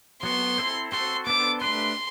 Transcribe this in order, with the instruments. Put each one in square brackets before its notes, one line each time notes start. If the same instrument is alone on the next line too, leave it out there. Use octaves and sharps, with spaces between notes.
[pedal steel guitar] F#3 B3 F#4 [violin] C6
[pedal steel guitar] C4 E4 A4 C5
[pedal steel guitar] C4 F#4 A4 C5 [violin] C6
[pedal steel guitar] B3 D4 A4 C5 [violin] D6
[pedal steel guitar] A3 D4 G4 B4 [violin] C6